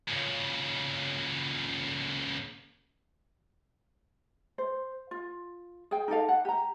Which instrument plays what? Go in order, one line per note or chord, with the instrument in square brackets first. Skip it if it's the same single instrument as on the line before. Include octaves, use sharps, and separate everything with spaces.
[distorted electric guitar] A#2 C#3
[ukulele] C5
F4
G#4 G5
D#4 G4 A4 F5
F#5
G4 A#5